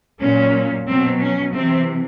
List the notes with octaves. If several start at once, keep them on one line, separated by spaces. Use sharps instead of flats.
A#2 F#3 C#4
B2 F#3 C4
C#4
C3 E3 C4